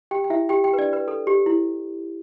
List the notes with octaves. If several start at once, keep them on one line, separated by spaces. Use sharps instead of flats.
G4 G5
G5
E4 E5
G4 G5
G4 G5
B4
D4 D5
B4
A4
G4
E4